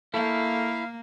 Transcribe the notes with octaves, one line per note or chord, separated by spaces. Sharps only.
A#3 E4 A4 F5 C#6 G6